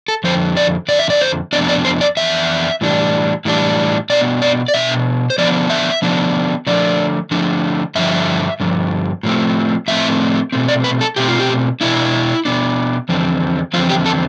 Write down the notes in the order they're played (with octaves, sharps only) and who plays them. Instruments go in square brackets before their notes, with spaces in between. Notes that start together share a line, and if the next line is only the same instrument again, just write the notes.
[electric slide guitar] A4
F2 D3 F3 C5
D5
F2 D3 F3 D5
E5
D5
C5
F2 E3 B3 D4 D5
D5
C5
D5
F2 E3 B3 D4 E5
A2 E3 G3 D4
A2 E3 G3 D4
B2 B3 D4 D5
D5
D5
B2 B3 D4 E5
C5
D3 F3 B3 D4 D5
E5
D3 F3 B3 D4
D3 F3 A3 D4 D5
D3 F3 A3 D4
G2 D3 F3 E5
G2 D3 F3
A2 F3 A3 C4
A2 F3 A3 C4 E5
B2 A3 C4
D5
B4
A4
B2 A3 C4 G4
F4
G4
B2 B3 D4 E4
B2 B3 D4
E2 D3 F3 C4
E2 D3 F3 C4 F4
G4
A4